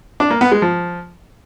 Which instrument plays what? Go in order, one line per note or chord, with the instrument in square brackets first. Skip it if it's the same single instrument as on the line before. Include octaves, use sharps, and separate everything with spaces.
[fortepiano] D4
A#3
B3
G#3
F3